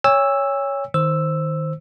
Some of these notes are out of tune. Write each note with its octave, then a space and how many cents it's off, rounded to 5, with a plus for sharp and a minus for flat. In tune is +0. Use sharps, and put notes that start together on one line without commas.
C#5 +10 G#5 -45 E6 +0
D#3 +0 C5 +0 E6 +0